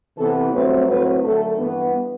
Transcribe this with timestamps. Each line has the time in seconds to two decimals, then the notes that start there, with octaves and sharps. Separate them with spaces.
0.17 C3 E3 B3 A4
0.52 G2 F#3 A3 C4 B4
0.87 A2 F#3 C4 B4
1.22 F#2 D3 A3 A4
1.58 G2 E3 B3